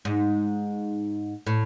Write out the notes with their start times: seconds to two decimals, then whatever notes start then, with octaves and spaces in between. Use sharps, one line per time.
0.05 G#2
1.47 A2